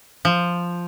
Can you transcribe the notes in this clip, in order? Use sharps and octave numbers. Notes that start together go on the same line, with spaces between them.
F3